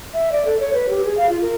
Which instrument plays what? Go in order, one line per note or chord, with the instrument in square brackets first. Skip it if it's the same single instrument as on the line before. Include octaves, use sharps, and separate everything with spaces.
[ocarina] E5
D5
A4
C#5
B4
G4
G#4
F5
F4
A#4